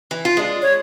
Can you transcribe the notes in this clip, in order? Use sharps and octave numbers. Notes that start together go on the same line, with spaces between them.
E3
F4
G#3 D4
C#5